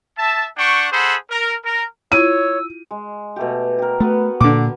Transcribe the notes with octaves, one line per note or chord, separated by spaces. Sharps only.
E5 A5
D4 F#5 G5 C#6
G#4 A4 C5 F#5 B5
A#4
A#4
E4 F4 C#5 E6 D#7
G#3
B2 A3 G4
G4 A#4
A3 B3 F#4 B4
A#2 D3 D6